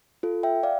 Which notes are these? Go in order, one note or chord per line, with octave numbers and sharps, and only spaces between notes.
F4 A4
E5 G5
D5 F5